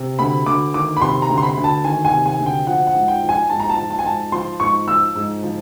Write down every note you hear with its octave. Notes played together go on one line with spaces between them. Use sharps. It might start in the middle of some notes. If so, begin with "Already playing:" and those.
Already playing: C3
D2 B5
D2 D6
D#3 D6
B5
C3 C6
A#5
D2
C6
B5
D2
A5
D#3 G#5
G#5
C3
G#5
D2
G5
F3 F#5
F#5
G#2
G5
F3
G#5
G#2 A5
A#5
A5
F3
A5
G#5
G#2 A5
F3 C6
G#2 C#6
F3 E6
G#2
F3